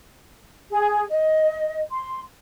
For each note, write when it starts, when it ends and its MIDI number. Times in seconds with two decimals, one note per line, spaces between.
0.70 1.05 68
1.09 1.80 75
1.91 2.21 84